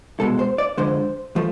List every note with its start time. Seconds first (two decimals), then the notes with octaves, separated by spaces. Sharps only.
0.20 C2 B2 G#3 A4
0.39 C5
0.58 D5
0.78 F2 D3 G#3 C5
1.36 F3 A3